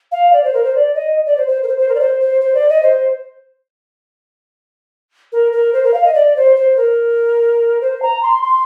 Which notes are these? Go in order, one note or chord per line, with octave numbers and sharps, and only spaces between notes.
F5
D5
C5
A#4
C5
D5
D#5
D5
C5
C5
A#4
C5
C5
A#4
D5
C5
C5
C5
D5
D#5
C5
A#4
A#4
C5
A#4
F5
D#5
D5
C5
C5
A#4
C5
A#5
C6
C6